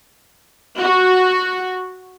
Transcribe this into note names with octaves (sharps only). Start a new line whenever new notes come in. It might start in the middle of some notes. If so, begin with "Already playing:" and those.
F#4